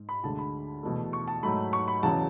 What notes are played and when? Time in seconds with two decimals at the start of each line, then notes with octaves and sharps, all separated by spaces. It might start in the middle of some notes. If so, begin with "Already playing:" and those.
Already playing: G#2
0.09 B5
0.23 D2 D3 G#3 A5
0.39 B5
0.83 E2 B2 A3
1.13 C#6
1.28 A5
1.43 G#2 F#3 A3 B5
1.73 C#6
1.88 B5
2.03 E2 C#3 F#3 A5